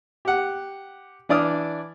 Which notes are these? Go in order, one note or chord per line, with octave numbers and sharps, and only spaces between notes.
G4 F#5
E3 D4 D5 D#6 F6